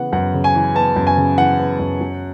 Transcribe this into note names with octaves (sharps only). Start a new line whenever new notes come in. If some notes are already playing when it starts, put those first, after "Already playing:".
Already playing: C#3 E3 B3 F#5
F#2 F#5
C#3
G#5
E3
B3 A5
F#2
G#5
C#3
E3 F#5
B3
F#2
F#3